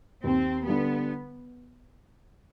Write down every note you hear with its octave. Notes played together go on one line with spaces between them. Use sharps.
D#2 C4
D3 G3 B3